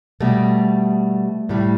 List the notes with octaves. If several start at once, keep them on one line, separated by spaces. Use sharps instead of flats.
B2 G3 A3
A2 G3